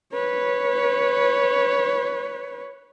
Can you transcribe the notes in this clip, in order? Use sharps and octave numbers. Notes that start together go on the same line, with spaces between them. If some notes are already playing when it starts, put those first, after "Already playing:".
B4 C#5